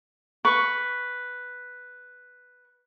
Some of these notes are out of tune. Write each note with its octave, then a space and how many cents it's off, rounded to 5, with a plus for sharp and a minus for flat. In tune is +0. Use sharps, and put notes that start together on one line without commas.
B4 +0 C#6 +0